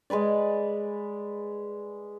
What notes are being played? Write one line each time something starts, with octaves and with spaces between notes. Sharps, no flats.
G#3 G#4 B4 D5